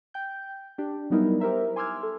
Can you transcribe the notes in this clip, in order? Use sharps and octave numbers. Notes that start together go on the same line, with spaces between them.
G5 G6
D4 G4
F#3 G3 B3 D#4 E4 A#4
G4 A#4 C5 E5 A#5
G#5 C6 D6 E6 F6 G#6
A4